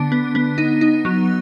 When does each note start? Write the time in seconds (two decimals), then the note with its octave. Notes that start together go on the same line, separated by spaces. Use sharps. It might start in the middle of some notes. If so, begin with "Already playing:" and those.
Already playing: D3 B3 D4
0.12 B3
0.35 B3
0.58 D#4
0.81 D#4
1.05 F#3